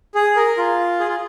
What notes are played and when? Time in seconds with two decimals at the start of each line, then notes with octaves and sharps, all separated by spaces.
0.15 G#4
0.36 A#4
0.57 F4
1.00 G#4
1.08 F4